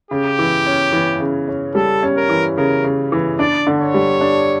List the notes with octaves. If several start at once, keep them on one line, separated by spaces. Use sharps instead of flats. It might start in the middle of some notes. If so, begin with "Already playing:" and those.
C#3 G4
E3
C#4
E3
C#3
C#4
G3 A4
C#4
A#4
E3
C#3 A#4
C#3
E3
D4 D5
D3
C#5
G3
D4